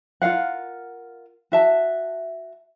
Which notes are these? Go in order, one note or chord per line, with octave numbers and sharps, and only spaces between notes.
F4 A#4 F5 F#5
F#4 E5 A5